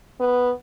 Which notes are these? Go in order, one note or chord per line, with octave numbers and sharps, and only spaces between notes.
B3